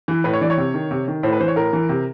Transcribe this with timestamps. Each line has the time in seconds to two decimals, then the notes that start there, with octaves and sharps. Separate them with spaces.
0.08 E3
0.24 A2 B4
0.33 C#5
0.41 E3 D5
0.50 C#5
0.57 C3
0.74 D#3
0.91 C3
1.08 D#3
1.23 A2 C5
1.32 B4
1.40 E3 C5
1.48 C#5
1.56 A2 A#4
1.73 E3
1.89 C3